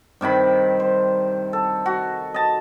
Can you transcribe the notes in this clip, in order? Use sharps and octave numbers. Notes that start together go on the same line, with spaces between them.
G2 C3 D#3 B5
C5
A4
F#4
D#5 A5